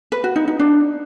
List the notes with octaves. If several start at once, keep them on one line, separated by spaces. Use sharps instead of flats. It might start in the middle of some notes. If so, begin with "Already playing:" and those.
B4
F#4
D#4
D#4
D4